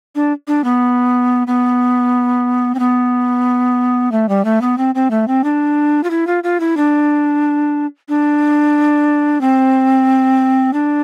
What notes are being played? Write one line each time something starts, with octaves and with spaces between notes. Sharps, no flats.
D4
D4
B3
B3
C4
B3
A3
G3
A3
B3
C4
C4
A3
C4
D4
F4
E4
F4
F4
E4
D4
D4
C4
D4